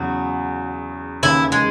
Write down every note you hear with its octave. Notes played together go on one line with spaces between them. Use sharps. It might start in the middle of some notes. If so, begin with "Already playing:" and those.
Already playing: E2 C#3 F#3 F#4
D#2 C#3 E3 E4
G#3